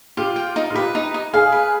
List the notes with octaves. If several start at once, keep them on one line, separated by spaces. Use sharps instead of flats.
F4 G4
G5
D#4
F4
G4 B4
D#4
D#4
G#4 F5
B4